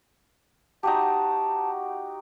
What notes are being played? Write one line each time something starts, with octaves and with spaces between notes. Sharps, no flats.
D#4 F#4 G4 A5